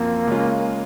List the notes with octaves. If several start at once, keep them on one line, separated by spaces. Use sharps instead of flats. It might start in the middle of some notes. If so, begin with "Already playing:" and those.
Already playing: F#2 F3 A#3 C4
C#3 G#3 C#4 F4